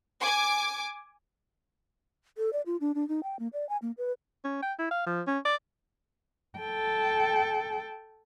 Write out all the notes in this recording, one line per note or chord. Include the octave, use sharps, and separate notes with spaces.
G#5 D6
A4
D5
F4
D4
D4
D#4
G5
A#3
D5
G#5
A#3
B4
C#4
G5
E4
F5
F3
C#4
D5
A4 G5